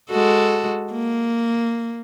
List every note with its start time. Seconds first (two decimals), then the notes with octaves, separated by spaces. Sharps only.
0.10 G#3 F#4 A4
0.92 A#3